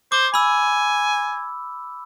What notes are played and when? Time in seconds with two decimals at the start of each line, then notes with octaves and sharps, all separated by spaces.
0.12 C5 D6
0.34 G#5 B5 E6